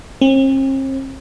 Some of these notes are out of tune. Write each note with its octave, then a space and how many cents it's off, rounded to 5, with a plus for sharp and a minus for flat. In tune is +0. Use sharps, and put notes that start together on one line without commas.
C4 +45